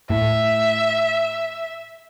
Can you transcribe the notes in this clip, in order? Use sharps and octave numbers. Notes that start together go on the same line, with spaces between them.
A2 E5